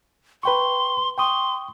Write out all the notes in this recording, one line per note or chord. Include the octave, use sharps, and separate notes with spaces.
B4 G5 C6 C#6
G5 C6 C#6 D#6